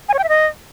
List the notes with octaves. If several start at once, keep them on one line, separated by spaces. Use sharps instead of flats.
G#5
C#5
G5
E5
D#5